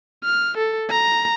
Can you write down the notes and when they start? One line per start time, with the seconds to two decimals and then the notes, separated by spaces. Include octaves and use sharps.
0.24 F6
0.58 A4
0.90 A#5